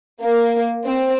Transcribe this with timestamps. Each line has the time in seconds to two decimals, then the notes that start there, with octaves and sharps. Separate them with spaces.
0.21 A#3
0.85 C4